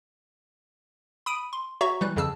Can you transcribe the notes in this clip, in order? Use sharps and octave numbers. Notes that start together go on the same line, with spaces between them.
B5 D#6 D7 D#7
C6
F#4 C#5 E5 A#5 C#6
E3 G3 F#6
F2 C#3 A5 E6